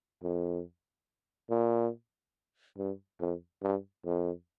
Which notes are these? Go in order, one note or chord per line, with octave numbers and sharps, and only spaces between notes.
F2
A#2
G2
F2
G2
F2